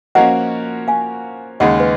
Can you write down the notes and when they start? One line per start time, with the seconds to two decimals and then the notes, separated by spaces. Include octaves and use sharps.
0.15 F3 A#3 C#4 F#4 A#4 D#5 F#5
0.88 F5 G#5
1.60 D#2 C#3 G#3 D#4 G#4 D#5 F#5
1.80 B4